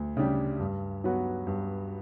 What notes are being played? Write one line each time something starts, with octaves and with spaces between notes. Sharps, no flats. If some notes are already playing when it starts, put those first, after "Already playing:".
Already playing: D2
C#3 G3 D4 G4
G2
F#3 B3 F#4
G2